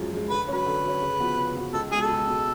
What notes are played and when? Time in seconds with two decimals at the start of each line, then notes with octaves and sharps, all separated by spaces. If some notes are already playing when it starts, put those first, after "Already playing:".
Already playing: F#2 F3 G#3
0.12 F3 G#3
0.30 D3 B4
0.48 F#3 C#4 B4
0.66 D3
0.84 F#3 C#4
1.02 C#3
1.20 F3 B3 F#4
1.37 C#3
1.56 F3 B3 F#4
1.73 C#2 A4
1.91 G#3 G#4
1.95 B2
2.01 A4
2.10 C#2
2.28 B2 G#3